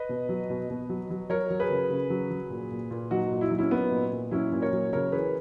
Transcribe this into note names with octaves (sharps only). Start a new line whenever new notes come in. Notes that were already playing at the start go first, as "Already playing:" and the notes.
Already playing: B4 D#5
B2
F#3
B2
B2
F#3
F#3
F#3 A#4 C#5
F#3
G#4 B4
C#3
C#3
F#3
F#3
A#2
A#2
A#2
F#3 D#4 F#4
A#2
E4
F#3 D#4
C#4 E4
F#3 B3 D#4
A#2
A#2
F#3 C#4 E4
A#2
A#4 C#5
F#3
C#3 A#4 C#5
E3 G#4 B4